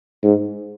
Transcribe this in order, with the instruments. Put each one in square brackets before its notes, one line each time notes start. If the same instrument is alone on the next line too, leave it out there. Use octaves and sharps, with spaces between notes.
[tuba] G#2